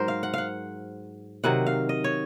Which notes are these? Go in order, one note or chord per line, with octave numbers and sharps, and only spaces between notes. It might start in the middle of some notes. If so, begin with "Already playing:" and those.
Already playing: G#2 F#3 A#4 C5
F5
F#5
F5 F#5
C3 D#3 F#3 F#5
F5
D#5
C#5